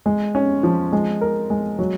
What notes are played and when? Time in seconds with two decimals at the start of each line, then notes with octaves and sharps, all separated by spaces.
0.06 G#3
0.35 C#4
0.63 F3
0.93 G#3
1.21 A#4
1.50 G#3
1.79 F#3